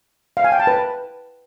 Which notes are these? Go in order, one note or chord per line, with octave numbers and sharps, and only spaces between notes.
F5
G#5
G5
A5
B4